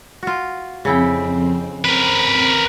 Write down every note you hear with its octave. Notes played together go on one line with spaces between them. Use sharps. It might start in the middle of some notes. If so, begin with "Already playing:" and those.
F4 F#4
F2 C#3 C4 E4 G5
C4 A#4 B4